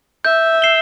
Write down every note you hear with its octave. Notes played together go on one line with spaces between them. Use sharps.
E5 G6
C7 E7 G7